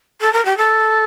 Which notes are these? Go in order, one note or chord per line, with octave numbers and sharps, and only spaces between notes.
A4
A#4
G4
A4